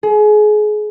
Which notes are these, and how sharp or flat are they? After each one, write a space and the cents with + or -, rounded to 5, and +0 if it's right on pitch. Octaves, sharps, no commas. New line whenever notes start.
G#4 +30